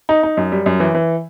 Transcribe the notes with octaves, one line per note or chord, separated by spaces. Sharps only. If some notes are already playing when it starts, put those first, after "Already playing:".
D#4
D#4
F#2
G3
F#2
E3
E3